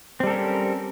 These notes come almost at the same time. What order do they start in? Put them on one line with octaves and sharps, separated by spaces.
C4 G3 A4 A#4 C#4